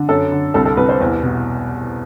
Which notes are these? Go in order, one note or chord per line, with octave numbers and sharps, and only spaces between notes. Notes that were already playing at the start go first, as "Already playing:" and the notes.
Already playing: D3
F#2 A4
D3
C2 A4
A4
C2 B4
C5
E2 B4
B2